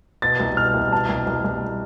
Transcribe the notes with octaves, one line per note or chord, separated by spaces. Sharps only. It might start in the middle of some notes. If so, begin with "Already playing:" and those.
B2 A6
C2
B2 F6
C2
B2 A5
C2
C2
C2